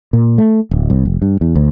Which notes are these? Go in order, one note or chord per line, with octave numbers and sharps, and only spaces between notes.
A#2
A3
D1
C2
F1
G2
E2
D2